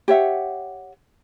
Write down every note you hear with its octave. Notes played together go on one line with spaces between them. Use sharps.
G4 C#5 E5 F#5